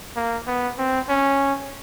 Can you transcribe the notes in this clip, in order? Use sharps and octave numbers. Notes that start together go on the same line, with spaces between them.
A#3
B3
C4
C#4